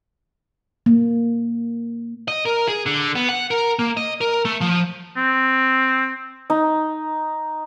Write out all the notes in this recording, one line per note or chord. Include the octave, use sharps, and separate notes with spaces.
A#3
D#5
A#4
G#4
D3
B3
F#5
A#4
A#3
D#5
A#4
A3
F3
C4
D#4